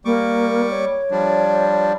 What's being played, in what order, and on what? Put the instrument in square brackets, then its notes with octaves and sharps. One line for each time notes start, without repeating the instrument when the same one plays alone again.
[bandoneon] G3 C#6 D6 [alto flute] A#3
[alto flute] C#5
[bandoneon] F3 G3 D4